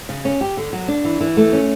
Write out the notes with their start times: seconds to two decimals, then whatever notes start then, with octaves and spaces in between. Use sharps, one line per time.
0.09 C#3
0.25 C#4
0.41 G4
0.57 D3
0.73 F#3
0.88 D4
1.05 E3
1.21 E3
1.37 A3
1.53 C#4